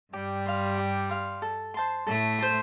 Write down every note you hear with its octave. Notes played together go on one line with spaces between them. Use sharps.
G2 G3 G4
F5 C6
G4
F5 C6
A4
C5 A5 C6
A2 A3 A4
C5 A5 C6